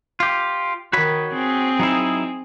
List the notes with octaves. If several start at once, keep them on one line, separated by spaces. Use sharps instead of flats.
F4 G4
D#3 F#4 C#5 B5
C4 G#4
F#3 D#4 E4